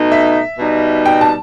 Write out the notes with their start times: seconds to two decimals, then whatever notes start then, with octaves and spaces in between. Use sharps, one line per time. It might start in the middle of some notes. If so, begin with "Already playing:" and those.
Already playing: B2 A3 D#4
0.12 E5
0.59 B2 G3 D#4
1.06 G5
1.21 A5